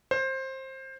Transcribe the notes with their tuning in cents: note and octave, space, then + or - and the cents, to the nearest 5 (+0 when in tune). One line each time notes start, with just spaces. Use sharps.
C5 +20